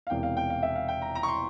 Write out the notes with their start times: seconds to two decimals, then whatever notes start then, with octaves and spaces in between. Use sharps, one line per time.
0.07 F5
0.10 E1 E2 C3 G5
0.23 F5
0.37 G5
0.50 F5
0.63 E5
0.75 F5
0.88 G5
1.02 A#5
1.15 A#5
1.23 C#6
1.28 C6